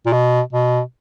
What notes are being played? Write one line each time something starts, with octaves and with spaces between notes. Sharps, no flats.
A#2
B2
B2